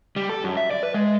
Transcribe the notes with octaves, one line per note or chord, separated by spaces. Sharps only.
G3
A4
F#2
E5
D5
B4
G#3